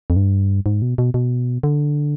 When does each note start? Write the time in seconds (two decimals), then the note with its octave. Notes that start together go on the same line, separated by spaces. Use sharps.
0.10 F2
0.16 G2
0.66 G#2
0.82 B2
0.98 B2
1.14 B2
1.63 D3